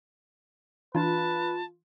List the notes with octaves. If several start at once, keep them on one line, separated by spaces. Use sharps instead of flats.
E3 D4 F4 B4 A5